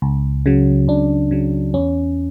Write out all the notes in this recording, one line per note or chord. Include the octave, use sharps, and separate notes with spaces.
C#2
C#3 F#3
C#2 D4
C#3 F#3
E2 C#4